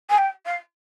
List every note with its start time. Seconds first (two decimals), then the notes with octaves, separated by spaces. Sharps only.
0.09 G#5
0.18 G5
0.45 F5